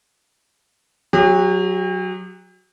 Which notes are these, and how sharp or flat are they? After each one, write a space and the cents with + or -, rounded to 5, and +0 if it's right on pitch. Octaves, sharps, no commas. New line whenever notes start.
F#3 +0 G4 +45